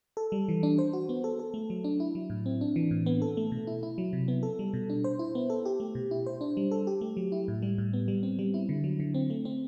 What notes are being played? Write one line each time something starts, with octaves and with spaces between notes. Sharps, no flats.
A4
G3
E3
D4
C5
F#4
B3
A4
A4
A3
F#3
D4
E4
F#3
A2
C4
D4
E3
A2
B3
A4
A3
B2
E4
E4
F#3
C3
B3
A4
G3
B2
D4
C5
E4
B3
A4
G4
A3
B2
E4
C5
D4
G3
A4
G4
A3
F#3
E4
A2
G3
A2
B3
G3
C4
G3
E4
D3
F#3
D3
C4
A3
C4